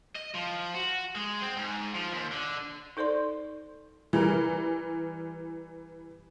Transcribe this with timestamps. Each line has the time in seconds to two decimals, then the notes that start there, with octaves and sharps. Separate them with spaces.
0.16 D#5
0.35 F3
0.75 F#4
1.15 G#3
1.42 C4
1.57 G#2
1.95 F3
2.13 D#2
2.32 D3
2.97 D#4 A4 C5 D5 C6
4.13 E3 G3 A#4